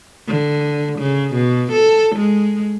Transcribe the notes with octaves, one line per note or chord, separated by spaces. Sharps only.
D3
C#3
B2
A4
G#3